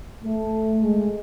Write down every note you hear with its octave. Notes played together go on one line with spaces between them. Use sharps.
A3
G#3